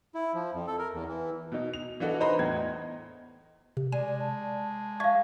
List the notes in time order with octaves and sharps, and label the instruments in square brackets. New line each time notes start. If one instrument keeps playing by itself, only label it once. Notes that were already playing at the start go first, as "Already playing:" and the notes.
[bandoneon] E4
F3
F2
A4
A#4
E2
E3
[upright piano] B2 D#4
F7
E3 D4 F#4 A4 D#5
D#4 B4 C5 D#5 A#5 B5
E2 A2 G#6
D#5
[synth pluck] C3
[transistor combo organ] G#3 [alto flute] D5 [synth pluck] G#5
[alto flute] A5
[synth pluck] D5 E5 C#6 [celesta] F5 G#6